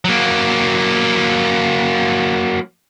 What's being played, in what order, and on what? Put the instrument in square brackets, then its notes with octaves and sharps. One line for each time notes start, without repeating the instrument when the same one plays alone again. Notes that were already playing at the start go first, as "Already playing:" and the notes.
[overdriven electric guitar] F#3 A#3